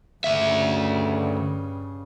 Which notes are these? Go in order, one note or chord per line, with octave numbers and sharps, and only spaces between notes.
D2 G2 C#3 E5